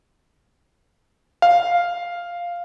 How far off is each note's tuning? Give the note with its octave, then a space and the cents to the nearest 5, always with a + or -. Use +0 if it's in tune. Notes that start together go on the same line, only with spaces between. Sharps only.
F5 +0